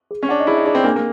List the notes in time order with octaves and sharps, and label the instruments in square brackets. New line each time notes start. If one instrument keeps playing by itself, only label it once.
[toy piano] G#4
[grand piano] C#4
[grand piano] D4 [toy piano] F#5
[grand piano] D#4
[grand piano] E4 [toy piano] G#4
[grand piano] D#4
[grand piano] D4 [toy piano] G#4
[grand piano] C4
[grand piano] A#3 [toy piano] D4
[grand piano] A#3